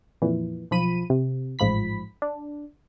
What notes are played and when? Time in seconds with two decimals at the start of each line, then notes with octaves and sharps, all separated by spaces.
0.22 F2 A#2 E3
0.71 B1 F3 B5 D#7
1.10 C3
1.59 A1 G#2 F3 B5 B6
2.22 D4